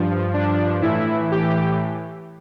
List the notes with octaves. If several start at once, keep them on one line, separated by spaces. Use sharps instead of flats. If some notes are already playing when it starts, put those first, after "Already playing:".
Already playing: G2 F3
D4
A2 E3 E4
G4